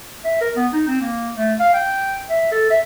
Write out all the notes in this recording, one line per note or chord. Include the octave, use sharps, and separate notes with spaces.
E5
A#4
B3
D#4
C4
A#3
A3
F5
G5
E5
A4
E5